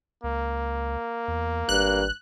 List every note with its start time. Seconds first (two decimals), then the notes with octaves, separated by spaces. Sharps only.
0.24 C#2 A#3
1.28 E2
1.69 G#1 G2 F#6